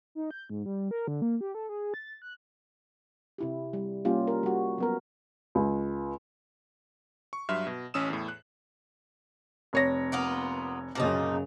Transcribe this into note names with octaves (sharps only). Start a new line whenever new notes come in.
D#4
G6
G#2
G3
A#4
D3
A#3
G4
A4
G#4
A6
F#6
C3 E4 G4
G3
G3 A#3 C#4 F4 G4
A#4
G3 F#4
F#3 B3 A#4
C#2
C#6
G2 F#3 E5 C6 F6
B2
A1 C#4 D#6 E6 E7
E2 A2
F#6
F1 C#5 A#6
A#3 B3 F4
F#2 A#2 C#3 F3 D#4